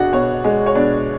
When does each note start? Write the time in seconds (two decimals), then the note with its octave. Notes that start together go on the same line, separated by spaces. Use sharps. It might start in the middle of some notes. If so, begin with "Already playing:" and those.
Already playing: B2 D4 F#4 G#4 F#5
0.13 B2 C#5
0.44 G#3
0.66 C#5
0.75 B2 D4 D5